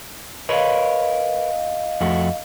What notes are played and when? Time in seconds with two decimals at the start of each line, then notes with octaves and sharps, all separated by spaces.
0.49 A#4 B4 C#5 D#5 F5
2.01 F2 A3 F#4